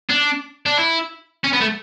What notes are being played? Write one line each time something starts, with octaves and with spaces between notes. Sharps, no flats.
D4
D4
E4
C#4
B3
A3